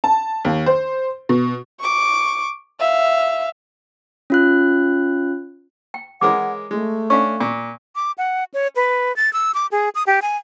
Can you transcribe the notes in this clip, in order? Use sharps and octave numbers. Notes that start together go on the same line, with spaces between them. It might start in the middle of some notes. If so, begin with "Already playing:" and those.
A5
D#2
C5
B2
C#6 D6
E5 F5
C#4 F4 F#6
G5
E3 G#3 A#4 C#5 F#5 D6
G#3 A3
C#4 D4 F5 C#6
A#2
D6
F#5
C#5
B4
A6
E6
D6
G#4
D#6
G4
G#5